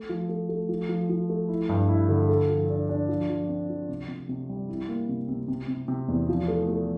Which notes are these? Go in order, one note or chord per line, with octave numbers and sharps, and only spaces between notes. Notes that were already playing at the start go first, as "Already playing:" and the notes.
Already playing: A3
F3
A3
A3
F3
F3
F3
A3
E4
G2
E4
D3
A4
F3
D4
D4
F3
F3
C4
F3
C3
C3
C3
G3
E4
A#3
C3
C3
C3
C3
C3
E2
F3
A3
A3